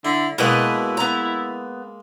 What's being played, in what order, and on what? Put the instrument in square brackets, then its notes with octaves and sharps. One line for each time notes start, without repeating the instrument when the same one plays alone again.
[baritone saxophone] D3 [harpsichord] E4
[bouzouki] B2 B4 D#5 [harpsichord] G#3 A#3 [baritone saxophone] E4
[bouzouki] B3 A#5